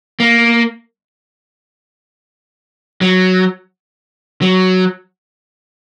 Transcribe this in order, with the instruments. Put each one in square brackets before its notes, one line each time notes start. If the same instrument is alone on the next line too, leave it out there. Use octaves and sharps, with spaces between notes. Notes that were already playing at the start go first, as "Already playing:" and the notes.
[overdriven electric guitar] A#3
F#3
F#3